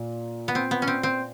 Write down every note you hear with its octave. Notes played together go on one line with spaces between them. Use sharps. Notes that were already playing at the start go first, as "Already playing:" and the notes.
Already playing: A#2
B3
C4
B3
C#4
C4
C4